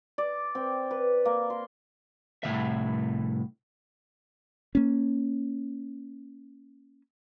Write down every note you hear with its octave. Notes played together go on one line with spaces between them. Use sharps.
D5
C4
B4
A#3
C6
C2 A2 C#3 E5
A#3 C#4